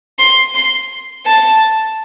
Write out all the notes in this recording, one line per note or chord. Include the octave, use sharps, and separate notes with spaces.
C6
C6
A5